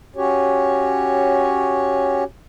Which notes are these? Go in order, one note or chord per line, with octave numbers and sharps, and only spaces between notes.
C#4 F#4 G4 C#5